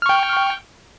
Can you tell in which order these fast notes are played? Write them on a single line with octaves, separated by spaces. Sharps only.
F6 C#6 G5